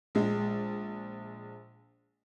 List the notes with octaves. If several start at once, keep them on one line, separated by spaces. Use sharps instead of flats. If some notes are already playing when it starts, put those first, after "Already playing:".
A#1 G#3